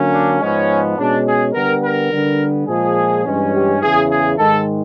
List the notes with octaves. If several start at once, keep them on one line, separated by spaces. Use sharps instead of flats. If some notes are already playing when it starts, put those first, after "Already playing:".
Already playing: D3 F#3 A#3 C#4
D4
G#2 F3 G#3 B3 C#4
B2 G#3 C#4 D4
G#4
D3 G3 B3 A#4
A#4
D3 G3 B3
A#2 F3 G#3 G#4
G2 E3 G#3 C#4
G4
E2 C#3 E3 G#4
G#4
G#2 D#3 G#3 A4